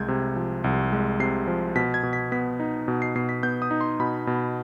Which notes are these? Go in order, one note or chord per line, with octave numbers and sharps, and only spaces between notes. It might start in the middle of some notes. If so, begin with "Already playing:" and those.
Already playing: C2 G#3 G6 G#6
C3
F3
C2
G#3
C3 C7
F3
B2 B6
G#6
B2
B6
B3 B6
D#4
B2
C7
B2 C7
B6
B3 G6
D#6
D#4
C6
B2 B5
B2